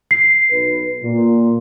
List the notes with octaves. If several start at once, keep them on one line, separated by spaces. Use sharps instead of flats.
C7
B1 B4
A#2